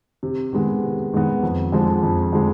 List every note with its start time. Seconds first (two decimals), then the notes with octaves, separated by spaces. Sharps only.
0.23 C3
0.53 D#3 G#3 B3
0.82 C3
1.13 D#3 G#3 B3
1.43 F2
1.72 D3 F3 G#3
2.03 F2
2.32 D3 F3 G#3